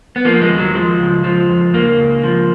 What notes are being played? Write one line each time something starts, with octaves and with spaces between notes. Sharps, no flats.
B3
F3 A#3
G#3
D#2
F#3
F3 G#3
C#2
F3
F2
C#2 A#3
C#2
F3